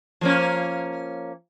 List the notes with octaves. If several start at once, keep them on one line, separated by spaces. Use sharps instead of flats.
F3 A#3 C#4